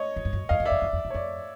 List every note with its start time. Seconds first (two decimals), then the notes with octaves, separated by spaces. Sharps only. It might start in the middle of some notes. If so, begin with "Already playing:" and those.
Already playing: C#5 D#5
0.16 F#2
0.25 G2
0.33 F#2
0.49 F2 D#5 F5
0.60 F#2
0.66 D5 E5
0.71 F2
0.82 F#2
0.93 F2
1.05 F#2
1.10 C#5
1.14 F2 D5